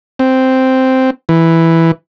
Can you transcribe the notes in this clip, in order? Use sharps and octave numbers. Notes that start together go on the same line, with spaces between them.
C4
E3